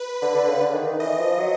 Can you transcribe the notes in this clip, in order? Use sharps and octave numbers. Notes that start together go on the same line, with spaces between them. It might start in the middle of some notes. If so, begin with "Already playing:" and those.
Already playing: B4
D3 B4
D3
C#3
D3
D#3
D#3
E3 D#5
F3
F#3